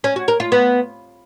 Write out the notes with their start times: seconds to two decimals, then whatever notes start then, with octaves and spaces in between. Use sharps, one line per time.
0.04 C#4
0.16 F#4
0.28 A#4
0.40 F4
0.52 B3